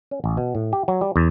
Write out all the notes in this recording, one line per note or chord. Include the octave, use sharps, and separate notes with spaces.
C#4
A1
B2
A2
G4
F#3
G3
E2